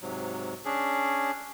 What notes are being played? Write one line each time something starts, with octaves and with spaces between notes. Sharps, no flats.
G#2 C3 F#3
C#4 D4 G#4